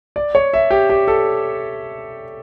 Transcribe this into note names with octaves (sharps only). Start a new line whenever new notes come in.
D5
C#5
E5
G4
G4
A4